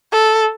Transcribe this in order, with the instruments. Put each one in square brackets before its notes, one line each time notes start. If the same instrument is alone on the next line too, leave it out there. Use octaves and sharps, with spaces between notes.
[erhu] A4